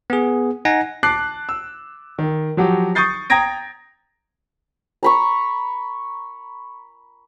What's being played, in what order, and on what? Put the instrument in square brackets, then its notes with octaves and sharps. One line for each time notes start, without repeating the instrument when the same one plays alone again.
[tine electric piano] B3 G#4
D#4 F#5 G#5 A#6
[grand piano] A5 D6 F#6 C7
E6
D#3
F3 F#3 F#4 G4
C#6 D#6 G6 A6 C7
G5 A#5 D#6 G#6 A#6 D7
[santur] A#5 B5 C#6